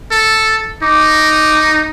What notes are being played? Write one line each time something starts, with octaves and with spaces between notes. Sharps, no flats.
A4
D#4 D6